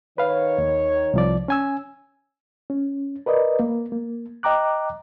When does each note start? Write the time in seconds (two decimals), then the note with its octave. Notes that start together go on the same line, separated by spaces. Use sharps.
0.18 D#3 B4 C#5 F5
0.58 D#2
1.14 C2 F3 D5
1.48 C#4 G#5 E6
2.70 C#4
3.26 A#4 B4 D5 D#5
3.59 A#3
3.92 A#3
4.43 D#5 G5 A#5 D6 F#6